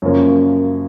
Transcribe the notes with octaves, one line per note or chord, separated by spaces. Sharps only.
F#2 C#3 F3 A#3 C#4